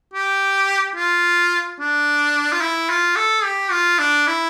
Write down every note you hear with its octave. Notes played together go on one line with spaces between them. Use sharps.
G4
F4
D4
F4
E4
F4
A4
G4
F4
D4
E4